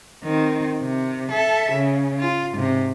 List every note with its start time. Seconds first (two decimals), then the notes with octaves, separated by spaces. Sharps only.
0.24 D#3 C4
0.81 C3
1.31 A4 E5
1.72 C#3
2.20 F4
2.53 G#2 C3